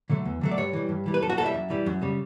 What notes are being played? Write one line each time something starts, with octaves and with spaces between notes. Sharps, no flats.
D3 F#3 A3
E2
D3 F#3 A3
D5
G2 C#5
E3 G3
G2
E3 G3
B4
F#2 A4
F#4
E3 G3 A4 E5
F#2
E3 G3
F#2
C#3 G3